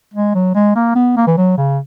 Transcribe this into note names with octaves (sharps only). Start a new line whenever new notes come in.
G#3
F#3
G#3
A#3
B3
A#3
E3
F#3
C#3